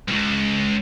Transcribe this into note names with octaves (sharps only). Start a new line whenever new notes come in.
C#2 G2